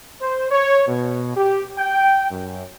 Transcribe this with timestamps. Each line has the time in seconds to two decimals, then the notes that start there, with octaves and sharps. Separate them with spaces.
0.21 C5
0.51 C#5
0.88 B2
1.36 G4
1.77 G5
2.30 F#2